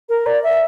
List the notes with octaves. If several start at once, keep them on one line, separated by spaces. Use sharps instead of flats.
A#4
D5
E5